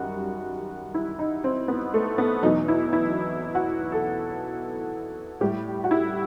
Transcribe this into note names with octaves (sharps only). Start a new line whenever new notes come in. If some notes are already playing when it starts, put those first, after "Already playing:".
Already playing: F#2 D#3 G3 F#4
E4
D#4
C4
B3
A3
B3
E2 B2 F#3 D#4
E4
E4
F#4
A4
A2 G3 G4
F#4
E4